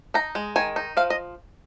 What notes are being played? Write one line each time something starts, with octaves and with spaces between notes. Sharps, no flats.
D#4 A#5
G#3
D#3 G#5
D#4
F3 F5
D#5